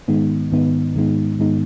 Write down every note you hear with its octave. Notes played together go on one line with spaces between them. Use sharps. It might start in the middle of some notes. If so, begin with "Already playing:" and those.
G#2 D#3 G#3 B3 D#4
G#2 D#3 G#3 B3 D#4
G#2 D#3 G#3 B3 D#4
G#2 D#3 G#3 B3 D#4